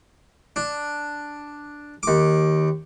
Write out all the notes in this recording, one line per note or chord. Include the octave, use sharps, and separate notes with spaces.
D4
D#2 D6